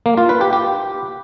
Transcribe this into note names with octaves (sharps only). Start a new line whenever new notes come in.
A#3
F4
B4
G4
G4